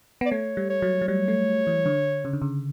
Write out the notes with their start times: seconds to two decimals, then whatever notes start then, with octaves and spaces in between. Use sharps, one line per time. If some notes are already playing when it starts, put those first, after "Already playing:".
0.21 B3 D5
0.31 A3 C#5
0.57 G3
0.70 C#5
0.82 F#3
1.02 F#3
1.08 G3 C#5
1.28 A3
1.67 E3
1.86 D3
2.25 C#3
2.33 D3
2.42 C#3